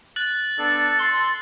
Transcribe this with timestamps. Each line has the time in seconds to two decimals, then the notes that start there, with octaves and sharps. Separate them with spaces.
0.16 F#6 A6 F#7
0.59 B3 D4 A4
0.99 C6 G7